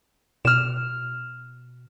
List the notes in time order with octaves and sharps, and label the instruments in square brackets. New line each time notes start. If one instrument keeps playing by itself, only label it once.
[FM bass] B2 [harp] F6 E7